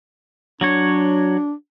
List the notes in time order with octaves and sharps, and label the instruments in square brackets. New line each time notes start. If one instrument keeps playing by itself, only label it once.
[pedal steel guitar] F#3 F#4 C#5 [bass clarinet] D4